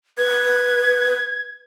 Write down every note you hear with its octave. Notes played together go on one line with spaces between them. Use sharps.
B4 G#6